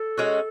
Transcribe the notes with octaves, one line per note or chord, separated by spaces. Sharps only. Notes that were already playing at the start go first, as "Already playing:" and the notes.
Already playing: A4
G#3 C#4 F#4